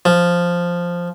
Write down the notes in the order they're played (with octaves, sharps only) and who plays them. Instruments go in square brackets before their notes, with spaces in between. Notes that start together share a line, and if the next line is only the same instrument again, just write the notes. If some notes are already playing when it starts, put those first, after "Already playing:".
[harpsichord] F3